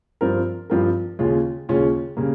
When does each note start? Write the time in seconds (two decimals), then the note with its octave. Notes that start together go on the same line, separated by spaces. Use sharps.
0.21 G2 F3 C4 F4 A#4
0.70 G2 F3 C4 F4 A#4
1.19 D#2 C#3 G#3 C#4 F4
1.69 D#2 C#3 G#3 C#4 F4
2.17 C#3 G3 A#3